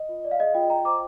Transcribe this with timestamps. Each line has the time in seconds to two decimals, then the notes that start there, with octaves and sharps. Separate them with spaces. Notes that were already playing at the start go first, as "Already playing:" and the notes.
Already playing: D#5
0.09 F4
0.25 D5
0.31 F5
0.39 G#4 D#5
0.54 F4 D#5 G5
0.70 F4 G5 A#5
0.85 C5 A#5 D6